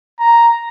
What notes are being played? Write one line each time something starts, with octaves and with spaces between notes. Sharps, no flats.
A#5